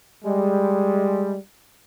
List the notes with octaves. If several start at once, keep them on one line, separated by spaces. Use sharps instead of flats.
G3 G#3